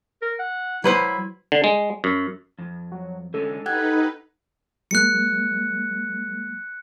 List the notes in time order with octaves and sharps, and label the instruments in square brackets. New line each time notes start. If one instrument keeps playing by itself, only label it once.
[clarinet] A#4
F#5
[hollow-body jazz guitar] F#3 B4 C5 [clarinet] E4
[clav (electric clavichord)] D3
G#3
F#2
[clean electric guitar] F2
[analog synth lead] F#3
[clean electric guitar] D3 G#3 C#4 [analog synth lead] A4
[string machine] D#4 B4 [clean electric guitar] G4 [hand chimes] F#5 F#6 G#6
[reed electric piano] F#3 G#3 A#3 [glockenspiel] F#6 C#7